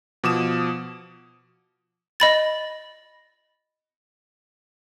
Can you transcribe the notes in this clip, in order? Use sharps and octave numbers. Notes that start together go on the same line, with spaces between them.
B2 F3 D6 D#6 E7
D#5 B5 A6